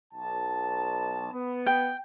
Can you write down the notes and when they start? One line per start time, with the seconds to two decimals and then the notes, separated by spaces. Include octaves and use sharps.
0.14 B1 A5
1.33 B3
1.66 G5